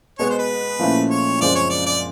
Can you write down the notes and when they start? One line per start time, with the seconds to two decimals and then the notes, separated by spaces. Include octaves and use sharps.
0.19 B2 G#3 B3 C#5
0.29 C5
0.39 B4
0.80 A#2 F3 A3 C#4 E4
1.10 C#5
1.40 F#2 C#3 F3 G#3 C4 D5
1.55 C#5
1.70 D5
1.86 D5